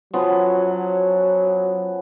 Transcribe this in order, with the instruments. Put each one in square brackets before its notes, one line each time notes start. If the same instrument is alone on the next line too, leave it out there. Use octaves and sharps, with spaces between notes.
[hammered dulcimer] F3 B3 C#4 [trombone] F#3